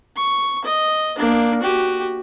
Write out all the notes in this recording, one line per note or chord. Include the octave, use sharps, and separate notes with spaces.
C#6
D#5
A#3 D4
F#4 G4